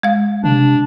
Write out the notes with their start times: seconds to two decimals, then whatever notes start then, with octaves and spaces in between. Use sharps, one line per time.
0.03 G#3 F5
0.44 C3 D4